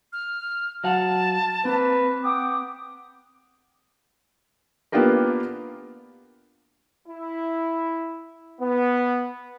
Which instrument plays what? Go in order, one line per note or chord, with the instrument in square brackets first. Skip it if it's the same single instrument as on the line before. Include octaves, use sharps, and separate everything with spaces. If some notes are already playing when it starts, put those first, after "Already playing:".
[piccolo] F6
[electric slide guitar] F#3 F5 F#5 [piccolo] A5
[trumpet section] A#3 B4 [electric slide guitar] C4
[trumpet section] F#5 G5 D6 [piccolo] D#6
[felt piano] A#3 B3 D4 F4 G4 A#4
[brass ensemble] E4
B3